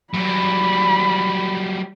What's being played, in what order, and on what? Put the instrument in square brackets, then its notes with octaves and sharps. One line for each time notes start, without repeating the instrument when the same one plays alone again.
[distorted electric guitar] F#3 G3 [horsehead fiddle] B5